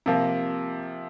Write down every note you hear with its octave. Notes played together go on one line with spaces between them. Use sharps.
C3 F3 A#3